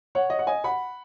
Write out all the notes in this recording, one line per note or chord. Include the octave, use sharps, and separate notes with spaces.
C#5 F#5
D#5
F#5
D#5 G#5
F#5 B5